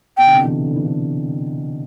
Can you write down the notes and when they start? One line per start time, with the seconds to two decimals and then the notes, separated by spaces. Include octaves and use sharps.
0.18 B2 G5
0.27 D3
0.34 C3
0.43 E3
0.50 D3
0.66 D3
0.76 E3
0.86 D3